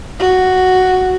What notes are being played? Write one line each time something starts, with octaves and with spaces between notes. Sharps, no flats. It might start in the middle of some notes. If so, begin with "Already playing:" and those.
F#4